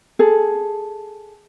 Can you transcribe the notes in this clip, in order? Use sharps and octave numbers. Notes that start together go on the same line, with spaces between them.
G#4 A4